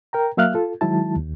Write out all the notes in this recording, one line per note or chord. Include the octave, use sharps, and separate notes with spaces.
A#4 G5 A#5
F#3 A#3 E5 F5 F6 F#6
F4 A4
D#3 F#3 G#3 E4 A5
D#2